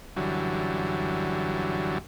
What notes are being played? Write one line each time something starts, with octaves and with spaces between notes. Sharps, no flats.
F#2 D3 E3 F#3 G3